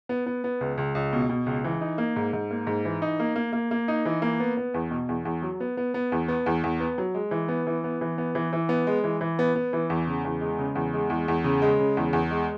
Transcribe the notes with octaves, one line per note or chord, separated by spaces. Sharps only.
B3
B3
B3
C#2
C#2
C#2
B2
B2
C#2
E3
D#4
A#3
G#2
G#2
A#3
G#2
E3
D#4
A#3
A#3
A#3
A#3
D#4
E3
A#3
B3
B3
E2
B2
E2
E2
F#3
B3
B3
B3
E2
B3
E2
E2
B3
F#3
G#3
E3
B3
E3
B3
E3
B3
E3
E3
B3
G#3
E3
E3
B3
B3
E3
E2
C#3
E2
G#3
C#3
E2
G#3
E2
E2
C#3
G#3
C#3
E2
E2
G#3